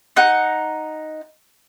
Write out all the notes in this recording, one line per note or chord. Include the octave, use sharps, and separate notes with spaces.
D#4 F#5